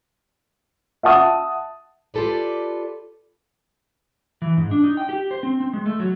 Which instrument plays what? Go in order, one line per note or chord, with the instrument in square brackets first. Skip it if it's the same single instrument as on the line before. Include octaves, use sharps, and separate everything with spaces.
[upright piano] E5 F#5 A5 D#6
[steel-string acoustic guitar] F4 G4 A4 B4 D5
[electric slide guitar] E3
G#2
D4
D#4
G5
G4
C5
C4
C4
G#3
A3
F#3